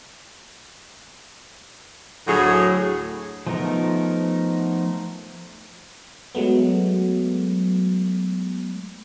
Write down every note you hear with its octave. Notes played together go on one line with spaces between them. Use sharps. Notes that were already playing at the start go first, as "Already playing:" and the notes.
D2 A2 F#3 G#4
F3 A3 B3 D#4 A#4
F#3 G#3 A3 B3